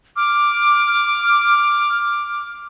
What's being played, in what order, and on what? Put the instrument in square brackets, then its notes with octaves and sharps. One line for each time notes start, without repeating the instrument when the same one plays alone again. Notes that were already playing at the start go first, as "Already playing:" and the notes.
[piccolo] D6 [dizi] F6